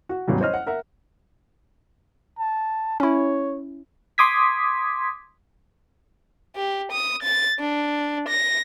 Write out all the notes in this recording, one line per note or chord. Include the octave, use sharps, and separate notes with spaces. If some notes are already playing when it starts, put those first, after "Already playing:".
F#4
A1 E2 F#3 G3
C5 C#5 D#5 F6
F#5
A#4 E5 F#5
A5
C#4 E4 C#5
C6 D6 D#6 G#6 B6
G4
D#6
A6
D4
A#6